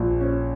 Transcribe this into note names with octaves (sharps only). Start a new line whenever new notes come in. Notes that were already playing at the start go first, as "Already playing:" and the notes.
Already playing: A#1
C#4